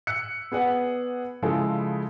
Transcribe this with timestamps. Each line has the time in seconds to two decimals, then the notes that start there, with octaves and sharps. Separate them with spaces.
0.07 E6 F#6 C#7
0.52 B3 G#4 D5 F#5
1.43 C#3 F3 G#3 E4 A4